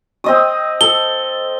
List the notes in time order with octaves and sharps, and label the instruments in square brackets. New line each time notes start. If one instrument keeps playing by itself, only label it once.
[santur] C4 D#5 D#6
[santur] A4 [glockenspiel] G7